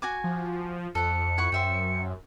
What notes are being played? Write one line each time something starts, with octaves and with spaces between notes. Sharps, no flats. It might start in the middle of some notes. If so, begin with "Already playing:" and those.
F#4 G#5 D6
F3
F2 A4 F#5 C#7
E4 F#5 C#6
F#2 C5 E5 G5